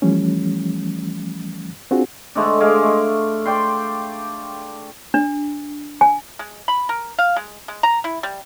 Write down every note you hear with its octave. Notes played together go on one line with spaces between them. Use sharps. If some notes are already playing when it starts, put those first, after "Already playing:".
E3 F3 G3 A3 C#4
C4 D4 F4 F#4 G#4
D3 G#3 A3 D4
G#3 G#4 F5 D6
A3
D5 G5 C6
D4
G#5
G#3
B5
A#4
F5
G#3
G#3
A#5
E4
G3